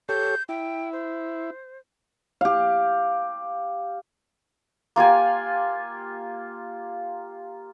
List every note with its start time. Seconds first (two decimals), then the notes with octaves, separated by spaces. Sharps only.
0.09 G4 A4 C#5 G6
0.49 E4 G5
0.93 C5
2.41 G4 F5
4.96 A#3 F4 G4 G#5